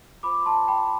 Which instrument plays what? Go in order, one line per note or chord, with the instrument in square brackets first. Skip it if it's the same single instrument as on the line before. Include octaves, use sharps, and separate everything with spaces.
[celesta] F4 C5 B5 D6
A5 C6
G5 B5